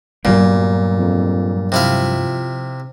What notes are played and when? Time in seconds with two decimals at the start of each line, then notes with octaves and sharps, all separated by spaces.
0.25 G2 A#2 F#3 G3 A#3 B3
0.98 F2
1.72 C3 F3 E4 F5